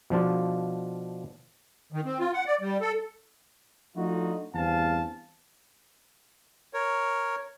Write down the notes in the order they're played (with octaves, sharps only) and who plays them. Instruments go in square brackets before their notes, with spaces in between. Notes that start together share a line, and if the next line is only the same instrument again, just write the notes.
[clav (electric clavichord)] B2 F3 D4 F4
[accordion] D#3
C4
F4
F#5
D5
G3
A4
[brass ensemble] F3 A3 D4 D#4 F4 F#4
E2 G2 C4 F5 G#5 A5
[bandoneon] A#4 C#5